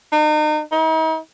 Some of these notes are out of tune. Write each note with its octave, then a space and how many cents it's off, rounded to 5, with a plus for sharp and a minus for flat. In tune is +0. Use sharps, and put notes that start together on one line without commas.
D#4 -35
D#4 +45